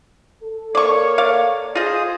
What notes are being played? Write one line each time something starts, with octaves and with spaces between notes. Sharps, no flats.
A4
A#3 C#5 D5 C#6
D5 F5
F4 G#4 C5 D#5 D#6